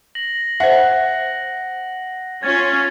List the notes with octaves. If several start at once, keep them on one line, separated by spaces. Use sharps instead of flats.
A#6 F#7
C5 E5 F#5
C#4 F4 G#6 A6